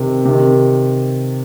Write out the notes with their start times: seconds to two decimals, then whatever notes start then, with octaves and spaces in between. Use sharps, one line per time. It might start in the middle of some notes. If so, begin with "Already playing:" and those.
Already playing: C3 D#3
0.25 C3 D#3